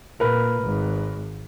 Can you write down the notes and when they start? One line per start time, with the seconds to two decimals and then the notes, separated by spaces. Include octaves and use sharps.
0.20 A#2 A#4 B4
0.63 G#1